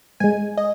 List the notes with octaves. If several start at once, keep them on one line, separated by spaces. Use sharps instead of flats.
G#2 G#3 G#5
D#5